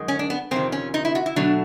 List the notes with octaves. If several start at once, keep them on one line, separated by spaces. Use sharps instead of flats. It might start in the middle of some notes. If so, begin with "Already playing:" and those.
Already playing: F#2 D#3 G#3
C#4
D4
B3
F2 C3 D#3 C4
C#4
D#4
E4
F#4
E4
B2 F#3 A3 D4